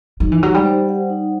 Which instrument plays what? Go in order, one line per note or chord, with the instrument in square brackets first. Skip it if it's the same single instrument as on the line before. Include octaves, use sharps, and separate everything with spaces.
[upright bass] F#3 [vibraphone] D#4
[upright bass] E3
[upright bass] F#3 [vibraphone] G4
[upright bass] G3
[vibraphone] C5
F#5
D#4